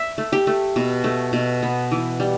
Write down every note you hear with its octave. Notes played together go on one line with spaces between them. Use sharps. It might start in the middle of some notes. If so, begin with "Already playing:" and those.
Already playing: E5
A3
G4
A3
B2
A3
B2
B3
E3
G3